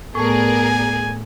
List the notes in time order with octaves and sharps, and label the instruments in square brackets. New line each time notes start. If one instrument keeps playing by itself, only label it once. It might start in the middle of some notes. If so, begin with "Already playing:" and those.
[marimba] A2 A3 [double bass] B3 [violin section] G#4 A#4 D5 [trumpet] G#5